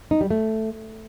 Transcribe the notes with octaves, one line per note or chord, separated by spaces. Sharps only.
D#4
G3
A3